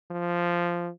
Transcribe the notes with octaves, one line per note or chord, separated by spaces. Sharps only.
F3